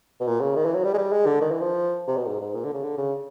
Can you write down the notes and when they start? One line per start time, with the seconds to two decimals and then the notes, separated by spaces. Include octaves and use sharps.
0.20 B2
0.27 A#2
0.41 C#3
0.56 D#3
0.65 E3
0.75 F#3
0.84 G3
0.94 G#3
0.98 G3
1.12 G#3
1.27 D3
1.41 D#3
1.51 E3
1.60 F3
2.07 C3
2.17 B2
2.26 G#2
2.41 G#2
2.55 A#2
2.64 D3
2.73 C#3
2.83 D3
2.97 C#3